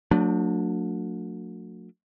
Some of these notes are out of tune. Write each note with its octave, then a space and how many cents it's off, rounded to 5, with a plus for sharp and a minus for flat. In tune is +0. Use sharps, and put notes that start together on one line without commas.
F#3 -35 A3 +35 D4 +0